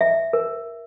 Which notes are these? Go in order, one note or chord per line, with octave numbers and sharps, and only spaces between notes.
E5
A#4